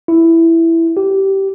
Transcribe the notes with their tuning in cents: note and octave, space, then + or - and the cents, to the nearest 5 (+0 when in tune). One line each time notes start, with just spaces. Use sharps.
E4 +5
G4 -15